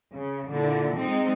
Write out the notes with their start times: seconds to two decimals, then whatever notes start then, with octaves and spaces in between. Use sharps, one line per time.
0.15 C#3
0.50 A#2 D3 E4
0.97 G#3 C4 D#4